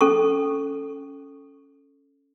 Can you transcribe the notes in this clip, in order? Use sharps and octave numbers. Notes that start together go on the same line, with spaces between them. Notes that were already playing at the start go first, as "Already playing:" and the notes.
C#4 A4 C#6